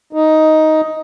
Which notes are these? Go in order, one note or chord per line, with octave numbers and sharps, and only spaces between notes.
D#4